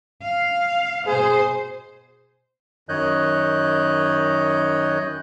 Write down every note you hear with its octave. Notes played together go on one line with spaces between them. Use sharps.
F5
B2 G#4 C5
F#2 D#3 C#5 D#5 F#6 G6